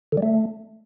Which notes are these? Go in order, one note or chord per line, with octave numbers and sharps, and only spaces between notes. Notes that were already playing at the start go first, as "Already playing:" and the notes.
D3
G3
A3